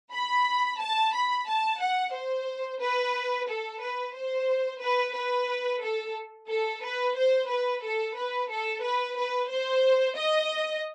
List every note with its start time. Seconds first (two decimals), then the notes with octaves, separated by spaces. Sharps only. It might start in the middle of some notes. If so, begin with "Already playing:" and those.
0.13 B5
0.81 A5
1.15 B5
1.48 A5
1.81 F#5
2.14 C5
2.81 B4
3.48 A4
3.82 B4
4.15 C5
4.82 B4
5.15 B4
5.82 A4
6.48 A4
6.83 B4
7.16 C5
7.49 B4
7.83 A4
8.15 B4
8.50 A4
8.83 B4
9.17 B4
9.50 C5
10.17 D#5